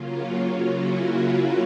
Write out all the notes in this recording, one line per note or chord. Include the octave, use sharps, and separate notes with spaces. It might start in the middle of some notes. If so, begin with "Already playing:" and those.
Already playing: C#3 F#3 A#3 C#4 F4
E4 F#4